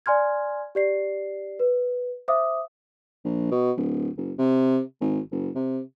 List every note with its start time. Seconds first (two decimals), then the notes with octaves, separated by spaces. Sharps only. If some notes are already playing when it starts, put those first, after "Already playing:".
0.06 D5 G#5 C6 F6 G#6
0.75 G4 D5 C7
1.59 B4
2.28 C5 E5 F5 D6 D#6
3.25 A#1
3.51 B2
3.76 D1
4.17 F#1
4.38 C3
5.01 G#1
5.31 F#1
5.55 C3